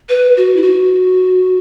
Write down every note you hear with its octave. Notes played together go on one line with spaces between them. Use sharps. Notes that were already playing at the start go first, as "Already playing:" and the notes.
B4
F#4
E4
F#4